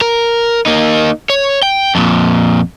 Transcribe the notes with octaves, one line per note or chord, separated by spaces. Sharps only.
A#4
A#3 D#4
C#5
G5
F2 A#2